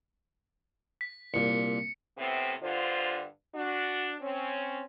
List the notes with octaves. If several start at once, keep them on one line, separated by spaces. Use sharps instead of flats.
B6
C2 A#2 C#7
A2 C3 B3 C4
G2 D3 F4 C5
D4 F#4
C4 C#4